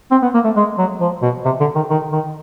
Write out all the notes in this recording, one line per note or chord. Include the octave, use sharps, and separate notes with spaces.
C4
B3
A#3
A3
G#3
F#3
F3
B2
C3
D3
D#3
D#3
D#3